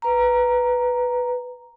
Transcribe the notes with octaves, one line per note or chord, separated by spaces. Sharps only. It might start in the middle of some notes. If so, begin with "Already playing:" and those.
B4 A#5